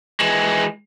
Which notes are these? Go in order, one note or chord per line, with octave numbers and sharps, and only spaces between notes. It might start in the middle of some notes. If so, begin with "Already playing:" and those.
E3 G#3